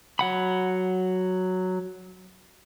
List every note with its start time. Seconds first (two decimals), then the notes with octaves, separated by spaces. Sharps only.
0.19 F#3 F#5 B5